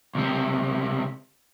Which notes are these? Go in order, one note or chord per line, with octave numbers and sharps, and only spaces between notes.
C#2 C3